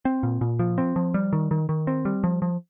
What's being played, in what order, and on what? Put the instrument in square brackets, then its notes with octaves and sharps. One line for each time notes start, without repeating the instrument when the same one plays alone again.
[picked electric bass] C4
A#2
A#2
F3
C4
F3
G3
D#3
D#3
D#3
C4
G3
F3
F3